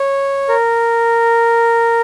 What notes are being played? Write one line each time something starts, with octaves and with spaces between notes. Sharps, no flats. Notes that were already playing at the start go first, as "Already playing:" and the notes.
Already playing: C#5
A#4